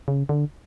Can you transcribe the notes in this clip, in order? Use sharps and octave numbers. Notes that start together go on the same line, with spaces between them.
C#3
D3